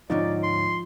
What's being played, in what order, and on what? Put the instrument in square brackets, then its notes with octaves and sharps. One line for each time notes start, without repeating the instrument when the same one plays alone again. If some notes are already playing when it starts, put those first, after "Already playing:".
[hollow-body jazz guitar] D2 G#2 C#4 [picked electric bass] F3 [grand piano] D#4 [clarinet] D5
[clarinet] C6